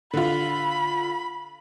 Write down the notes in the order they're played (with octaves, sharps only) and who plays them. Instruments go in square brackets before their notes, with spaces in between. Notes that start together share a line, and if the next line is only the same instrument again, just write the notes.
[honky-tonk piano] D3 F4 [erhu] B5